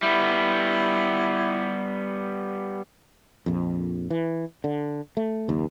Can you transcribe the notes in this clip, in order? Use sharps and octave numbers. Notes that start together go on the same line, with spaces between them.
G3 B3 E4
A#1 F2
E3
D3
A3
F#1 D#2